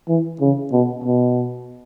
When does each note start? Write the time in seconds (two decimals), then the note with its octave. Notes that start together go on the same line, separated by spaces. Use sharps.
0.08 E3
0.41 C#3
0.72 B2
1.04 B2